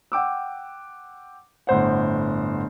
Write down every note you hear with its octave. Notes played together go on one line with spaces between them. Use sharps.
F#5 G5 D6 E6
G1 A2 C5 F#5